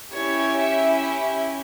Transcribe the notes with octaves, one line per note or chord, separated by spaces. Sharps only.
C#4 E4 G4 C#5
E5